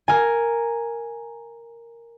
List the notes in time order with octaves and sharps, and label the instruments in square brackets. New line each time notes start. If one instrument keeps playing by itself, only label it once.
[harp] A#4 G#5